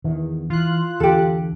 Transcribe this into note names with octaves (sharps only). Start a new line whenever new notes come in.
E2 D#3
E3 F4 F#6
E2 D3 G4 A4